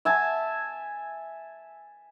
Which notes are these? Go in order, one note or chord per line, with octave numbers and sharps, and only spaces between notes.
E5 G#5 A5